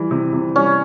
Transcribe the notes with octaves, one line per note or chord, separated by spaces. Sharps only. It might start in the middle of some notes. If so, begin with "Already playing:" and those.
Already playing: E3 G3
C3
C3
G3 C#4